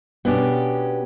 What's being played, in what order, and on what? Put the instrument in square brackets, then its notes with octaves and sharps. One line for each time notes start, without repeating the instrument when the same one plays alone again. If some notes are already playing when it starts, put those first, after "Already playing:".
[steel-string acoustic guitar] B2 C#4 G4 [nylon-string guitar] B3 D4